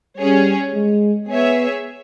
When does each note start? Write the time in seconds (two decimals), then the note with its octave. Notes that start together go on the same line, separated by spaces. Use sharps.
0.17 G3 C#4 G#4 C#5
0.74 G#3
1.29 B3 G#4 C#5 E5